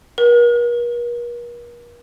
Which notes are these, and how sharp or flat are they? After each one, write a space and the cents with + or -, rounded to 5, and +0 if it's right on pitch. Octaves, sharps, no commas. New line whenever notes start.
A#4 +45